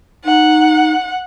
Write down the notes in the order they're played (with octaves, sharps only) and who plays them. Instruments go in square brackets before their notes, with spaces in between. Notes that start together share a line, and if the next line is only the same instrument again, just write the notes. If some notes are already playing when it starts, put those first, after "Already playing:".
[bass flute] D#4 [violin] F#5